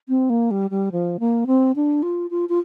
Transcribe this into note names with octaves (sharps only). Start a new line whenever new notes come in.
C4
A#3
G3
G3
F3
A#3
C4
D4
F4
F4
F4